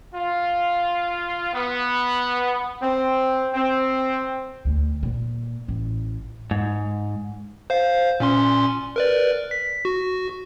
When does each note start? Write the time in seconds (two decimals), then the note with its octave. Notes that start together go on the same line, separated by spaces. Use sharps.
0.14 F4
1.53 B3
2.82 C4
3.54 C4
4.65 D2
5.03 A#2
5.68 A1
6.51 G#2
7.70 C5 F5
8.20 A#2 C#4 C6
8.96 A#4 B4 D5
9.51 B6
9.85 F#4